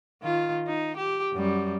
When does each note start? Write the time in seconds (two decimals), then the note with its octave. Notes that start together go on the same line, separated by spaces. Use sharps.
0.22 D#3 F4
0.67 D#4
0.97 G4
1.33 F#2 G3